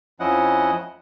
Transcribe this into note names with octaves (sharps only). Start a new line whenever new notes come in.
F2 F3 C#4 E4 D#5 F#5